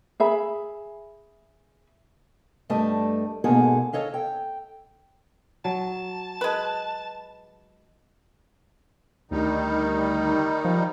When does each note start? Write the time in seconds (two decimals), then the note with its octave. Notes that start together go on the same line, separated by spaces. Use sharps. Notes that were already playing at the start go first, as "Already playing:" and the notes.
0.20 G#4 E5 B5
2.69 G2 G3 A3 D#5 A5
3.44 G#2 B2 A#3 G#4 A4
3.93 A4 C#5 D#5 F5
4.14 G5
5.65 F#3 A5
6.41 G#3 B4
9.31 D2 D#3 G3 D#4
10.65 F3